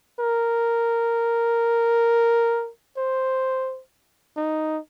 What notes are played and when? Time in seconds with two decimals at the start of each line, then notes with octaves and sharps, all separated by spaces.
0.19 A#4
2.97 C5
4.37 D#4